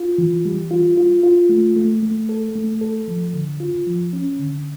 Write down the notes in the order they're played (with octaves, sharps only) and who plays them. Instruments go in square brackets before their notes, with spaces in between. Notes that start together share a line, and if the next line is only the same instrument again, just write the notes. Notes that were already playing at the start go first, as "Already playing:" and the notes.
Already playing: [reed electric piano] F4
E3
G3
F4
F4
F4
A3
A3
A3
A4
A3
A4
F3
D3
F4
F3
C#4
D3